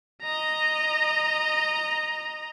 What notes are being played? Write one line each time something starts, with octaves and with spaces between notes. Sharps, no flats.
D#5 A#5